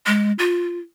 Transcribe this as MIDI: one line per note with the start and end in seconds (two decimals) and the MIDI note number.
0.07 0.32 56
0.39 0.79 65